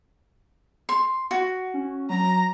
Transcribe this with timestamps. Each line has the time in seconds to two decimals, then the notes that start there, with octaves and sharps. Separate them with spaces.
0.89 C6
1.31 F#4
1.74 C#4
2.10 F#3 A#5